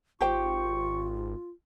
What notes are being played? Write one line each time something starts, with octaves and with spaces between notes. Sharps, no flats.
G#1 F4 G4 C5 G5 C#6